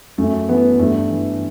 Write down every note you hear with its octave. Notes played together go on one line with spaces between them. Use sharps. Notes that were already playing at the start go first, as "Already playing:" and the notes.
F#2 A3
E3 B3
G2 A3
E3